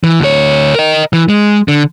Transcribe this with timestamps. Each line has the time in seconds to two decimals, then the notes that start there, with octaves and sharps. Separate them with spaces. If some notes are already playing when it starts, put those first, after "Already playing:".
0.04 E3
0.20 D2 C#5
0.75 A#4 D#5
1.13 E3
1.29 G#3
1.68 D3